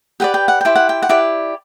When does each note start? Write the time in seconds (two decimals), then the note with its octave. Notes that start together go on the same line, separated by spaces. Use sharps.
0.20 G4 B4 D5 F#5
0.34 G5
0.48 F#5
0.61 E4 G4 C5 G5
0.76 F#5
0.89 G5
1.02 F#5
1.09 E4 G4 D5